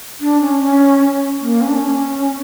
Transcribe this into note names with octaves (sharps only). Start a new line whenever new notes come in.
D4
C#4
C#4
A#3
C#4
D4
C#4